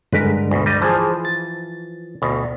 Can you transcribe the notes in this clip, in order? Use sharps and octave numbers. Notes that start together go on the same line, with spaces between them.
G2 D3 G#3 A#4 B4
D2 B2
G3 D#5
E3 F3 G#4 C5 A5
A6
D2 B2